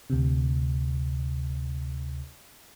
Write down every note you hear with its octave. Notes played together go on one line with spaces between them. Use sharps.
D2 C3